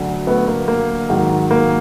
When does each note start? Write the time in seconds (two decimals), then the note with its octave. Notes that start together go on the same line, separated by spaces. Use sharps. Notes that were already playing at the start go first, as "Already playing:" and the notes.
Already playing: D2 D3 F#3
0.27 A3 B3
0.48 A#3
0.68 A#3
1.09 G#2 D#3 F#3
1.51 A#3